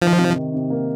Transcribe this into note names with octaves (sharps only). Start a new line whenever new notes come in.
D#3 F3
C3
D#3
C3
A#3